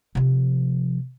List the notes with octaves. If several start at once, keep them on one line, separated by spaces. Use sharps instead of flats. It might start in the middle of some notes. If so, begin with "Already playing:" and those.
C3 F3